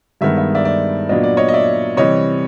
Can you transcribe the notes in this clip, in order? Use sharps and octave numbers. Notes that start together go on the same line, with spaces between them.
G2 D#3 G#3 B3 E5
E5
D5 E5
D5 E5
A#2 F#3 B3 D4 D#5
D5
C#5 D#5
D#5
D5 E5
C3 E3 G3 C#5 D#5